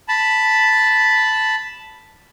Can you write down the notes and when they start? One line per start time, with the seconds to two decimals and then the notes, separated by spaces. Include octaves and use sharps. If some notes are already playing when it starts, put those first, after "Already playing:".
0.08 A5 B5